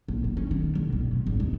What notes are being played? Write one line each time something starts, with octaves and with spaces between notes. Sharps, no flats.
A#1
A#3
C#4
D#3
C2
B2
G2
G#1
D#2